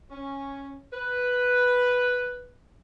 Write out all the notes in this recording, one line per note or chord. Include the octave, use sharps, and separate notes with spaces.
C#4
B4